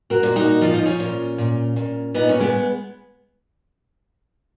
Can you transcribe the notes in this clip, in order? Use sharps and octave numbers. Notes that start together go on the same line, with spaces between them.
F#4 A#4
A#2
D#4 F#4
F3 F4
D#4
C#4 F4
A#2
A#2
A#2
A#2 B3 D#4
C#4
G#3 B3